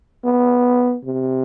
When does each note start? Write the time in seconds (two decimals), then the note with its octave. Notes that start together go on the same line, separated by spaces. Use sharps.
0.25 B3
1.05 C3